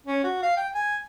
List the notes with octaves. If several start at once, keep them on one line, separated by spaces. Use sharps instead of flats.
C#4
F#4
F5
G5
G#5